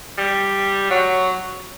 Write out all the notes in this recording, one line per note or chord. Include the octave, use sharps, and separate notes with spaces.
G3
F#3